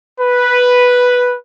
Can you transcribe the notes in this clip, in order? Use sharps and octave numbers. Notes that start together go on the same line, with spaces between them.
B4